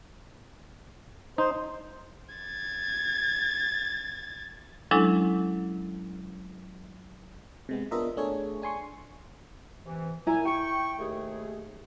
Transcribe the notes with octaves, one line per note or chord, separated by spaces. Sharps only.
D#4 C5
G#6 A6
F#3 G#3 C#4 D4 E4 A4
C3 G#3 B3
B3 D4 F4 A#4 D#5 E5
A3 D4 G#4 A4 C#5
D4 G#5 C6 C#6
C3 E3
A#2 E4 G#5 A#5
G5 C#6
D#2 A3 G#4